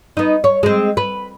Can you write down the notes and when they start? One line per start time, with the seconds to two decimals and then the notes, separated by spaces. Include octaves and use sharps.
0.17 B3 D#4
0.44 C#5
0.63 G#3 C4
0.97 B4